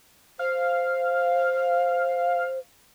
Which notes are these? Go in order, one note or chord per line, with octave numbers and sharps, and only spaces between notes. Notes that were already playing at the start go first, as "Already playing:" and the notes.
C5 F5